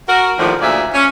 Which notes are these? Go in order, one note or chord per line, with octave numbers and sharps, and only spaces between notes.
F#4 A#4
D#2 A2 D3 D#3 F3
D2 A#2 F3 G#4 D5 E5
C#4